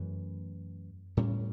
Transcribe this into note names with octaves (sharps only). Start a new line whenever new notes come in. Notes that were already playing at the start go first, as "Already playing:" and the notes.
Already playing: F#2 E3 A3
A2 G3 C#4